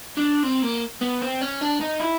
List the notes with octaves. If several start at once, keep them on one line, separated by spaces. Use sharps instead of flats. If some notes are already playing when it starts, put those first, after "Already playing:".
D4
C4
A#3
B3
C4
C#4
D4
D#4
E4